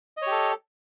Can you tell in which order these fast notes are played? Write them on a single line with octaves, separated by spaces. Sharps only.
D#5 C#5 G4 A4